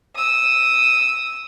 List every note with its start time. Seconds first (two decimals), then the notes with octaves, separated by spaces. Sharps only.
0.16 D#6 E6